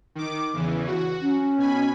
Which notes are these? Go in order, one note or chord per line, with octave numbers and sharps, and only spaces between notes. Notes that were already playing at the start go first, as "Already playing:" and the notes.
D#3 D6
E2 C#3 E3
F#4
C#4
B2 G#5 B5